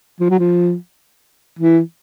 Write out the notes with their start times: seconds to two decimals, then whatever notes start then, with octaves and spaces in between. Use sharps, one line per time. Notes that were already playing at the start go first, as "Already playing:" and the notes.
0.20 F3
0.30 F#3
0.39 F3
1.59 E3